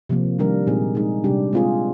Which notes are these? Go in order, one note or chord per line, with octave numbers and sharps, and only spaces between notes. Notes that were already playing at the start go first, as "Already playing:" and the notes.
C3 F3 A#3
D#3 G3 D4 G4 A#4
A#2 G#3 C4 D#4 G#4
G#3 D#4 G#4
C3 G3 D4 G4
G#3 C4 F4 G#4